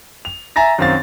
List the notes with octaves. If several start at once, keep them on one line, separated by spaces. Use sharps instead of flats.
F7
E5 G#5 A#5 A6 A#6
F#2 D#3 C4 F5 A6